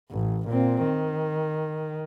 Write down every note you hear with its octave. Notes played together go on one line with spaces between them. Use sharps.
A1
A#2 C4
D#3